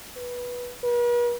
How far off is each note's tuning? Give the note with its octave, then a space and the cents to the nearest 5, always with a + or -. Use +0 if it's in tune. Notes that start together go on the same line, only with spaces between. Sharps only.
B4 -15
B4 -45